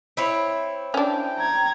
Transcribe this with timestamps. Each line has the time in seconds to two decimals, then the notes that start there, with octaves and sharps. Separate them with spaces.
0.17 C4 E4 C#5
0.94 C#4 D4 G5
1.39 A#5 G#6